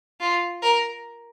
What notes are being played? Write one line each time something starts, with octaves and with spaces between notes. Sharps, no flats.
F4
A#4